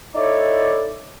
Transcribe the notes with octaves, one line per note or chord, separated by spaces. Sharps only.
D#4 E4 A4 C#5 D5